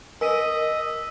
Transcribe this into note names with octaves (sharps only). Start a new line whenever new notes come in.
A#4 D#5 G#5 E6 B6 D#7